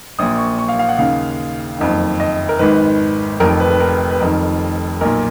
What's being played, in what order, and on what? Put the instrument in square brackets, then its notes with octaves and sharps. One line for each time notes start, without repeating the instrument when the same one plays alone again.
[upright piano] A#1 A#2 D#6
C#6
C#6
F5
F5
F#5
D#2 C#3 F5
F#1 F2 D#3
D#5
A#4
G#1 G#2 D#3 B4
F1 F2 D#3 A#4
B4
B4
A#4
B4
F1 F2 D#3 A#4
B1 A#2 A#4